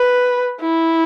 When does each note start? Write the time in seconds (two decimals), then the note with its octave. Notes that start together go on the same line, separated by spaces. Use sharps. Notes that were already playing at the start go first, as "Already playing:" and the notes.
Already playing: B4
0.61 E4